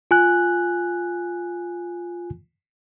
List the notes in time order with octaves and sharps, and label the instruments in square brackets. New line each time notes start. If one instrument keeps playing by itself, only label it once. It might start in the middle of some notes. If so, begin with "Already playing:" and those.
[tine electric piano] F4 G#5 F#6